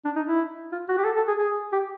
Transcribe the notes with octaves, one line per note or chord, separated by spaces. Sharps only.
D4
D#4
E4
F4
F#4
G4
A4
A4
G#4
G#4
G4